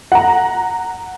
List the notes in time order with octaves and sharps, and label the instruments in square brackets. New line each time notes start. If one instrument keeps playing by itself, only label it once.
[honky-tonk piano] F#5 A#5